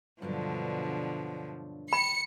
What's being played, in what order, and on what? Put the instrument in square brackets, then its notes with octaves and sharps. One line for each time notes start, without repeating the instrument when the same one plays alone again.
[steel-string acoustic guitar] G2 F#3 D4 [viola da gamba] B2 D3 F3
[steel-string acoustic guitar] G5 [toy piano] B5 [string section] C#7